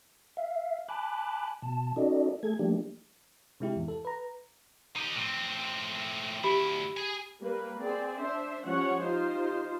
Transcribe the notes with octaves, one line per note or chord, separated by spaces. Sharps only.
E5 F5
G#5 A5 B5 D6 F#6
B2 A5
C#4 D#4 F#4 A4 D5 D#5
A3 G#4 A4 G#6
F3 G3 A3 A#3 D4 G4
C3 G#3 E4 G4
E2 G#2
A4
B4 A#5
D#4 G4
A2 C4
D2 E4 G4 B5
G#4 G#5
G3 A#3 B4
C4 G#4 D5
D4 C5 E5
F3 G3 C#4 C#5 F#5
D#4 F4 G4 C5